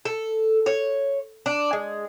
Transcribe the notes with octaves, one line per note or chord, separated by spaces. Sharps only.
A4
C#5
D4
G#3